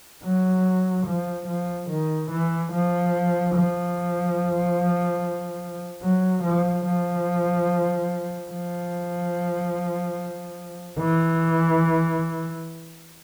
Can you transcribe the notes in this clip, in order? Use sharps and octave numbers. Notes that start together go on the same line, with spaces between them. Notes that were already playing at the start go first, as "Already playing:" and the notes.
F#3
F3
F3
D#3
E3
F3
F3
F#3
F3
F3
F3
E3